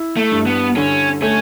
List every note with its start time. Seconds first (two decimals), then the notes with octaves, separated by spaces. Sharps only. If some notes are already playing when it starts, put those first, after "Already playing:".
Already playing: E4
0.17 A3
0.31 G2
0.46 B3
0.76 D3 C#4
1.22 A3 C#4